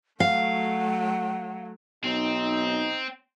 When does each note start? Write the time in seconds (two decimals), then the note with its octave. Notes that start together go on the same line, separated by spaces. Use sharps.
0.20 F#3 A3 F5 F#5
2.04 B1 C4 D#4